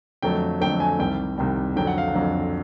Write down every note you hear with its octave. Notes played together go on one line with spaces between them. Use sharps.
F2 D3 F#3 A3 G5
F2 D3 F#3 A3 G5
G#5
C2 C3 D#3 G3 G5
C2 C3 D#3 G3
F2 D3 F#3 G5
F#5
F5
F#5
F2 D3 F#3